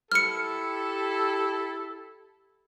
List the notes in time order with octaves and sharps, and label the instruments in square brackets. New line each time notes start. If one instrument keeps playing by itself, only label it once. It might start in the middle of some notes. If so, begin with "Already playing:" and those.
[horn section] E4 G4 A4 [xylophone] F6 C#7